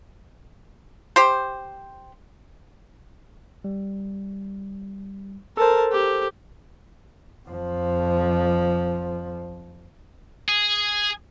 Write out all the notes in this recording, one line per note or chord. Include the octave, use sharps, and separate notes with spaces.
G4 C5
G3
A4 A#4 C5 A5
G4
F2 F3
G#4